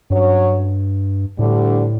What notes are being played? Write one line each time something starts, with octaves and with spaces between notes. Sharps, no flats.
G2 F#3 C#4 F#4 C#5
D2 A2 D3 G3 D4